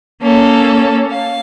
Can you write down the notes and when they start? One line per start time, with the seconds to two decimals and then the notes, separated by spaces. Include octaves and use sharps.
0.21 A#3 C#4 A4
1.12 F5